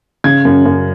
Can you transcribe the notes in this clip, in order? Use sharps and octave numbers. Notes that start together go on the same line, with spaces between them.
C#3 G#6
F#2
F#2